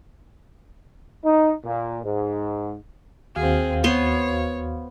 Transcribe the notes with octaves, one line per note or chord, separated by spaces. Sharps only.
D#4
A#2
G#2
D#2 C4 F#4 G#4 F5
B3 C5 C#5 C6